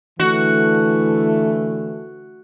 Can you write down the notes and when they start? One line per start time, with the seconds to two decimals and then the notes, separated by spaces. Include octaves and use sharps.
0.20 D3 E3 A3 F#4